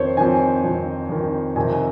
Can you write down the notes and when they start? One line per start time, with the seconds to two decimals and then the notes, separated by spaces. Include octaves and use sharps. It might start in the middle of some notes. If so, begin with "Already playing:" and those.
Already playing: F2 D#3 C5 C#5
0.17 F2 D#3 G#5
0.64 F2 D#3
1.09 F2 D#3
1.56 F2 C3 D#3 G#5